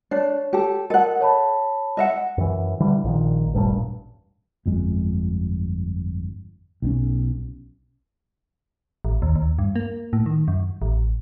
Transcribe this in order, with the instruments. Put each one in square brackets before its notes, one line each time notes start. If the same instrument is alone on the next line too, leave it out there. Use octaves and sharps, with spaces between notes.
[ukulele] D4 [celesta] C#5
[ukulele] G4 A4
[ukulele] A4 F#5 [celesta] A#4 D#5
[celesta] C#5 A5 B5
[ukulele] D#5 E5 F#5
[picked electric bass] F#2 E3
D3 E3 G3
A#1 A#2 D#3
E1 A1 G2 A#2
[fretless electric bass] G1 F2 G#3
B1 F3 C#4
[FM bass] A1
D#2
D#2
G2
A#3
A2
D#3
F#2
A1